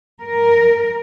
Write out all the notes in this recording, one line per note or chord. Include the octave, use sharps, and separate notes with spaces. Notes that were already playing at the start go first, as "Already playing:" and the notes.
A#4